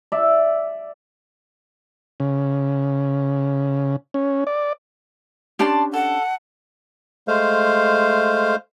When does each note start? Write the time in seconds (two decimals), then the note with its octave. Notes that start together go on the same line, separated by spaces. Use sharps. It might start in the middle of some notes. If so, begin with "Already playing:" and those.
0.12 D5 E5
2.20 C#3
4.14 C#4
4.47 D5
5.59 C#4 D4 G4 D5 A5 C6
5.94 A4 F#5
7.28 G#3 A3 C5 F5